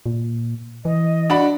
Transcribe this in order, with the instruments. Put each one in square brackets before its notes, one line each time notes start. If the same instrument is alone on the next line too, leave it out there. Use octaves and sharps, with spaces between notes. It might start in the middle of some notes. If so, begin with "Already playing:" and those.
[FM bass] A#2
[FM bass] E3 [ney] D#5
[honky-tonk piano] D4 F#4 B5